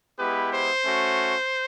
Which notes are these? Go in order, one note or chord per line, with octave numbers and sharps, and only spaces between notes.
G#3 B3 E4 G4 B4
C5
A3 C#4 F#4